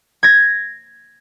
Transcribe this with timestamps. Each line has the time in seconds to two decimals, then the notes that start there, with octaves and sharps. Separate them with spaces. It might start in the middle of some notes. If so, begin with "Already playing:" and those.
0.23 G#6 A#6